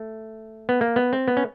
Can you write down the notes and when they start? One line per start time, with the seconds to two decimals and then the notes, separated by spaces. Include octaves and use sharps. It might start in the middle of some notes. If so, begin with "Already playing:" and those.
Already playing: A3
0.69 B3
0.81 A#3
0.96 B3
1.13 C4
1.28 B3
1.37 C#4